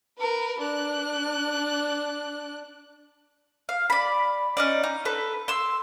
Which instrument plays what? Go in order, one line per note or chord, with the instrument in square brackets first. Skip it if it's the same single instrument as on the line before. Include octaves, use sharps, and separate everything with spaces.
[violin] A#4 B4
D4 F#6
[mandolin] F5
D5 B5
C#4 D#4 D5
D#4
A4 B4
C6 E6